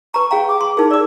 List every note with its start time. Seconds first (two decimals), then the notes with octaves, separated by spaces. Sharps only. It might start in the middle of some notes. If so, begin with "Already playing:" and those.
0.14 B4 A#5 C#6
0.31 G#4 F5 G5 A#5
0.48 D6
0.61 C6
0.77 D#4 G#4 A#4
0.91 D5 D6 E6